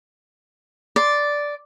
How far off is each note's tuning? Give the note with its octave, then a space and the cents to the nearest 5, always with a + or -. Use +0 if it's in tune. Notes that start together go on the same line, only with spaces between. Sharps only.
D5 -5 C6 +0